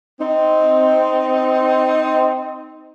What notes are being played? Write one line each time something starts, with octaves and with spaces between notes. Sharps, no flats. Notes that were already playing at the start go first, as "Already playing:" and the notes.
C4 D#4